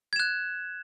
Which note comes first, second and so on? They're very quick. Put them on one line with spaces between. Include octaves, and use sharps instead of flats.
G#6 E7 F#6